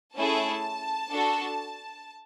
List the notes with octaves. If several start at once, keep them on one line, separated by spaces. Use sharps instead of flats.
A3 C#4 E4 G#4 A5
D4 F#4 A4